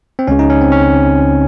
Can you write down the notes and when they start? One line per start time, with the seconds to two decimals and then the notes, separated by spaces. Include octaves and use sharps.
0.19 C4
0.28 C#2 C#3 C#4
0.39 D#4
0.50 C#4
0.61 C4
0.72 C#4